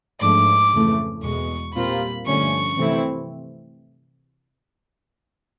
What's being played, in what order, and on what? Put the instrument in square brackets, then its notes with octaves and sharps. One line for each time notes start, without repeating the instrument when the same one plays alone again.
[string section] G#2 F3 A3 D4 [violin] D6
[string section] F2 C#3 E3 A3
[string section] E2 B2 G#3 [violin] C#6
[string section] A#2 G3 C4 F4 A#4 [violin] B5
[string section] G2 D3 F3 A3 C#4 [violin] C#6
[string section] C3 E3 A3 C4 E4